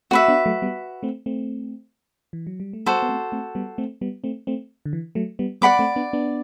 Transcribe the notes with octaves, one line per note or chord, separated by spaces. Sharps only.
A3 C4 F#4 B4 E5
B3 D4
F#3 A3
G3 B3
A3 C4
A3 C4
E3
F#3
G3
A3
G3 B3 F#4 A4 C5
B3
A3 C4
A3 C4
G3 B3
A3 C4
G3 B3
A3 C4
A3 C4
D3
E3
F#3 A3
G3 B3
G3 B3 D5 F#5 B5 D6
A3 C4
B3 D4
B3 D4